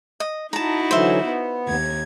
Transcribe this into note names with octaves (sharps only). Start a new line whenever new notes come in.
D#5
D#4 E4 F#4 A5 A#5
D3 E3 F#3 C5 E5
B3
D#2 G#6